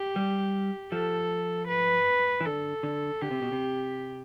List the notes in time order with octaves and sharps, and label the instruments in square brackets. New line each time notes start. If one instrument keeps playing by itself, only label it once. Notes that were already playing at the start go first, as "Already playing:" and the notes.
Already playing: [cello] G4
[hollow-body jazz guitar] G3
[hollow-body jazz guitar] F3 [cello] A4
[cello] B4
[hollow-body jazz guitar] E3
[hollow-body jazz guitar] D3 [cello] A4
[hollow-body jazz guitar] D3
[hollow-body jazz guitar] D3 [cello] G4
[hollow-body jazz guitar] C3
B2
C3